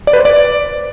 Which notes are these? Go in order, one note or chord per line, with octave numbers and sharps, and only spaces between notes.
D5
B4
C5
D5